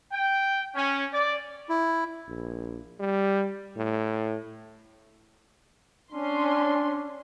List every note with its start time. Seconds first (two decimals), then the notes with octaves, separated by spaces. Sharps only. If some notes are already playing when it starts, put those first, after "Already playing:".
0.12 G5
0.75 C#4
1.12 D5
1.69 E4
2.28 A#1
3.00 G3
3.77 A2
6.12 C#4 D4 C6